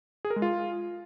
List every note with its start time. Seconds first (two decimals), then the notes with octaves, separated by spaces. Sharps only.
0.25 G#4
0.30 A#4
0.36 G#3
0.42 F4